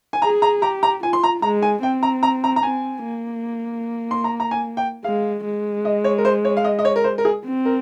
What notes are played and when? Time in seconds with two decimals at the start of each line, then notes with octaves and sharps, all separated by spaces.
0.13 G#5
0.22 G#4 A#5
0.42 A#5
0.62 G4 A#5
0.83 A#5
1.03 F4 G#5
1.13 C6
1.24 A#5
1.42 G#3 A#5
1.62 G#5
1.83 C4 G5
2.03 A#5
2.23 A#5
2.44 A#5
2.56 A#5
2.63 C4 G#5
3.03 A#3
4.11 C6
4.24 A#5
4.40 A#5
4.51 G#5
4.77 G5
5.04 G#3 F5
5.44 G#3
5.85 D#5
6.04 C#5
6.18 A#4
6.25 C5
6.45 C#5
6.57 F5
6.65 D#5
6.79 D#5
6.85 C#5
6.96 A#4
7.04 C5
7.18 A#4
7.25 G#4
7.45 C4
7.66 A#4